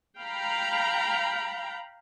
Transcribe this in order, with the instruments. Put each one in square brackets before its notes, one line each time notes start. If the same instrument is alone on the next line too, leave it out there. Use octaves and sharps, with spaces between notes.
[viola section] F5 G5 A#5 B5